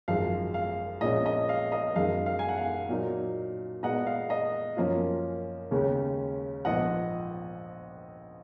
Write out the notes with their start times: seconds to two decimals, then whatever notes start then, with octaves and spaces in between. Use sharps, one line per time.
0.08 G#1 F#2 F3 G#3 F5
0.54 F5
1.01 A#1 A#2 G#3 C#4 D#5
1.26 D#5
1.49 F5
1.72 D#5
1.96 F#2 D#3 G#3 F5
2.26 F5
2.39 G#5
2.49 F#5
2.58 F5
2.89 A#2 F#3 A#3 D#4
3.83 A#2 G#3 B3 D#5 F#5
4.07 F5
4.30 D#5
4.77 F#2 F3 A#3 C#4 F4
5.71 D#2 C#3 G#3 C#4
6.65 A#1 G#2 F3 B3 D#5 F#5